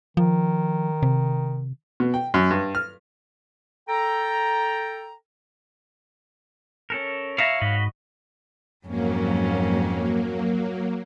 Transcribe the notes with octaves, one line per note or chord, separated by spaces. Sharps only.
D#3 F3
C3
B2
G5
F#2
G2
F6
A4 G5 A#5
C#4 A4 A#4
E4 C#5 E5 F5 A#5
G#2 F#4 D#5 B5
F2 G#2 F#3 A#3 C#4